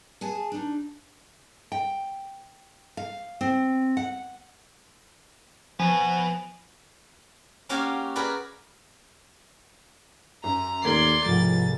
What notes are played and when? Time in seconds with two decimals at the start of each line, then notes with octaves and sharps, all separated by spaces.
0.21 G#4 G#5 A5
0.52 D4 D#4
1.72 G5
2.97 F5
3.41 C4
3.97 F#5
5.80 F3 B3 F#4 G#5
7.69 A#3 C#4 F#4 G4 F5 G#5
8.15 F#4 G#4 A#4 B4 D5
10.44 F#2 A#5
10.84 D#2 A2 A#4 D5 C6 G#6
11.25 C2 G#2 F3 A6